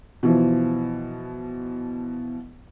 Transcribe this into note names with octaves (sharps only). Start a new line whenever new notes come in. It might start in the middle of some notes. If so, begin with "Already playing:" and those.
B2 E3 F3